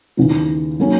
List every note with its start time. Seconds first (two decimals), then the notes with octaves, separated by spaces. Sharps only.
0.17 D#2 C#3 E3
0.80 D#3 F#3 A#3 C#4